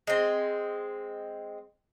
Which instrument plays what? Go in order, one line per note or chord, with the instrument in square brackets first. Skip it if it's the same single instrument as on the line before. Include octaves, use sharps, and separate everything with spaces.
[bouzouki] G#3 C4